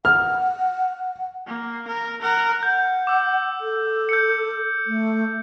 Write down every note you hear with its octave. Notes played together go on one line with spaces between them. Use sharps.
F#5 F6
A#3
A#4
A#4 F#5
F#5 G6
D6 E6
A4
G6 C#7
A3